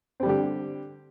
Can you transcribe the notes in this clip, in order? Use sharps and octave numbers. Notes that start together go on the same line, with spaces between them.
D3 G3 C4 G4